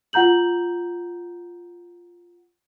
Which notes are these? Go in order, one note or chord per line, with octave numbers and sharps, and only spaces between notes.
F4 F#5 A#5 G6 F#7